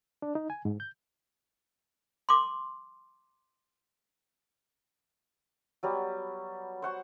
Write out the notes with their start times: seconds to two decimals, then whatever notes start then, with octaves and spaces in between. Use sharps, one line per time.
0.22 D4
0.35 D#4
0.50 G#5
0.65 G#2
0.80 G6
2.29 C6 D6
5.83 F#3 G3 B3
6.82 C5 F#5 C#6